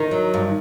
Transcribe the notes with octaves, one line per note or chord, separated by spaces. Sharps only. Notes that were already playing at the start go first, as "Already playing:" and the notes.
Already playing: D#3 D#4
F#3
G2